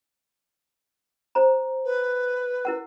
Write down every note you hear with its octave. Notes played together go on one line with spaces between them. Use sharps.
C5 A#5
B4
E4 A#4 F#5